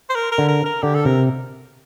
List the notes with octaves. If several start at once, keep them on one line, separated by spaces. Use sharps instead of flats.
C5
A#4
A#4
D3
A#4
A#4
D3 G4
A4
C3 A#4